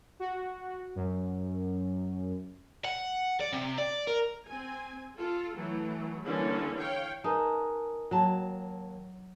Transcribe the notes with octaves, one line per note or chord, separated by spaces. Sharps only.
F#4
F#2
F#5
D5
C3
D5
A#4
C4 G#5
F4 A4
E3 F#3 A3
D3 E3 G3 A#3 C#4
C#5 F5 G5
D#4 G#4 A#4 B4 A5
D#2 F#3 A5